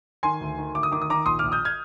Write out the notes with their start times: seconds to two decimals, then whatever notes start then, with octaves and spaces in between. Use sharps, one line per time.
0.23 D#3 G#5 C6
0.41 D2
0.58 D#3
0.74 D2 D6
0.83 D#6
0.92 D#3 D6
1.02 D#6
1.10 D#3 A#5 D6
1.26 A#1 C6 D#6
1.39 A#1 D6 F6
1.52 D#6 G6
1.65 F6 G#6